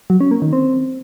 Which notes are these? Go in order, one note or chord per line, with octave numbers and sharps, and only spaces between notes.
F#3
C#4
A#3
D#3
C4